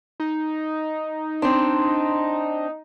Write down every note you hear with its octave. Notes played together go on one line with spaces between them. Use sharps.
D#4
C4 D4 C6